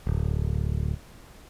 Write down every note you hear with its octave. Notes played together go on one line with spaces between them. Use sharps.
D1